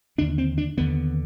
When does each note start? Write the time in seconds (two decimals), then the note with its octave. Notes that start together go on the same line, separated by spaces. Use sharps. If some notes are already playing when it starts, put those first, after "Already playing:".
0.18 D#2 D3 D4
0.38 C4
0.58 D4
0.77 D#2 D3 B3